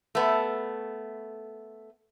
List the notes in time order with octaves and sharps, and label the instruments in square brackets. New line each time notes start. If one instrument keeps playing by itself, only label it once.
[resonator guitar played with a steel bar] A3 B3